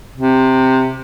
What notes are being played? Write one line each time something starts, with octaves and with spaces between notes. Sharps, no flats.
C3